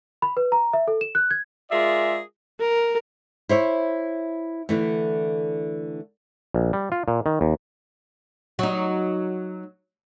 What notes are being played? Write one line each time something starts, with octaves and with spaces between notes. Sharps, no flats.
B5
B4
A#5
E5
A4
E7
F#6
G#6
G#3 F4 G#4 A#4 D5 E5
A#4
E4 C5 C#5 E5
D3 E3 A3
A#1
G3
F4
A#2
D#3
D#2
F#3 D#4